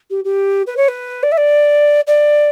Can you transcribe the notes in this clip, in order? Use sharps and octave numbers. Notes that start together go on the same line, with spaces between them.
G4
G4
B4
C#5
B4
D5
E5
D5
D5